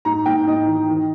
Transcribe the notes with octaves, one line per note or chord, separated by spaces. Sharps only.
G#2 A#5
G#2 G5
G#2 D#5
D#3
D#3